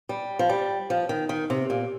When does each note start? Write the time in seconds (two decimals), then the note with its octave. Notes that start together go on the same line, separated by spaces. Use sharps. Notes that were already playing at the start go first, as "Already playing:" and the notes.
0.09 G3
0.39 F3
0.50 G3
0.90 F3
1.09 D#3
1.29 D#3
1.50 C3
1.70 A#2